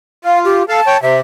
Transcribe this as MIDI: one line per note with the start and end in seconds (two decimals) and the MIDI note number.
0.24 0.63 65
0.24 0.39 77
0.45 0.65 67
0.69 0.80 69
0.69 0.80 77
0.69 1.01 81
0.87 0.97 73
0.87 0.97 79
1.02 1.20 48
1.02 1.17 76